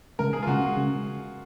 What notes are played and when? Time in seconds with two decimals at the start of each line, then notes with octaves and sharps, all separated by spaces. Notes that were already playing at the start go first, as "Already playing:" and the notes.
0.19 C#3 G#3 C#4 A#4
0.33 G#4
0.42 F4
0.47 C#3 G#3 C#4 F#4
0.77 C#3 G#3 C#4